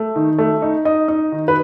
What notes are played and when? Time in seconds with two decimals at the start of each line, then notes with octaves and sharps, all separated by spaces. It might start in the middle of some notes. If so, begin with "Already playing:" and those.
Already playing: A3
0.16 D#3
0.39 A3
0.62 D#4
0.85 D#4 D#5
1.08 D#4
1.32 D#3
1.48 B4